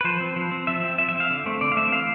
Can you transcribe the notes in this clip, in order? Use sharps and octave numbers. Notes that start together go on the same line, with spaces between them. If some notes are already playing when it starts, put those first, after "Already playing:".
B4
F3 C5
C4
F3
C4
F3 E5
C4
F3 E5
E5
C4
F5
D3
A3 C4
D3 D5
F5
A3 C4 E5
E3 F5